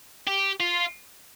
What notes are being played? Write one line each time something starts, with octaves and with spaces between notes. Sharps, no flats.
G4
F4